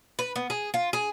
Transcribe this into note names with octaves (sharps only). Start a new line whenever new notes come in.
B4
B3
G#4
F4
G#4